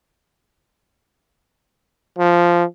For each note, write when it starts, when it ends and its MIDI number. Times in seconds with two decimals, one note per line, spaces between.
2.18 2.65 53